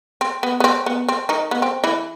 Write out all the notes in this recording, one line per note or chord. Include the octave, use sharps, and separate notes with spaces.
C4
B3
B3
C4
B3
C4
D#3 D#4
B3
C4
E3 E4